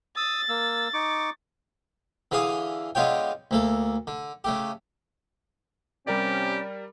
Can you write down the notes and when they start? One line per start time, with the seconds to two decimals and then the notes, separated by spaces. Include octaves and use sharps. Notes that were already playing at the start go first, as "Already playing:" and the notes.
0.17 D#6 E6 A6
0.49 A#3 E6
0.94 D#4 C#6 D6
2.31 D3 E3 G#4 F5 G#5 D#6
2.95 D3 G#3 B3 F4 C#5 G5
3.51 D2 A#3 A4
4.07 D3
4.44 C#3 A3 G4
6.07 C3 G3 C4 C#4 G4 A#4 D5